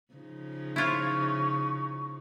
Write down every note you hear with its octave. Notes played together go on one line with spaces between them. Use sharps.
C#3 F3 D#4
E4 F4 C#5 C#6